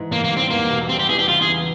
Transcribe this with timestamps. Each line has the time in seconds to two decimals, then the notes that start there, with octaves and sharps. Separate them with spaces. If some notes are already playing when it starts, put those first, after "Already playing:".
Already playing: G#2 E3
0.11 G#2 A#3
0.24 A#3
0.31 G3
0.37 C4
0.50 E2 A#3
0.70 E1
0.89 G3 C4
0.99 G4
1.09 E3 G#4
1.19 G4
1.28 C#3 F4
1.42 G#4
1.48 E2